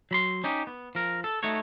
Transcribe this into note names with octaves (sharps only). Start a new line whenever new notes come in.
F#3 B5 C6
C#4 D#4 G4
B3
F3 A#4
A4
A3 D#4 F#4 C#5